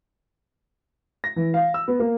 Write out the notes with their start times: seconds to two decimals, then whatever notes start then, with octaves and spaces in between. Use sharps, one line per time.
1.24 A#6
1.36 E3
1.54 F5
1.74 E6
1.88 B3
1.99 A#3